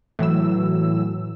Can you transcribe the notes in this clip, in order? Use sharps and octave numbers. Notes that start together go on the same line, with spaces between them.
A2 E3 F#3 E6